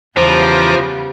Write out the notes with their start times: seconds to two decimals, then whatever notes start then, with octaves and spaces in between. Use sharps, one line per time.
0.17 E2 C#3 F3 G3 B3 C5 A#5 D6